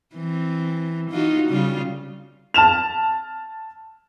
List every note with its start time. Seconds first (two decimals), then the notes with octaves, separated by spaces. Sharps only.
0.15 E3 C4
1.11 D#4 F4 F#4
1.49 C#3 G3 F4
2.54 A5 F6 E7 F7